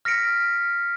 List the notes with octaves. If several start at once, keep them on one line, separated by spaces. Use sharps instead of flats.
F6 A#6 B6 C#7 D7